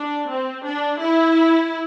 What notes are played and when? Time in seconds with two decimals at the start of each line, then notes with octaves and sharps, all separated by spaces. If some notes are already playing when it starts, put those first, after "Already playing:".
Already playing: D4
0.30 C4
0.65 D4
1.01 E4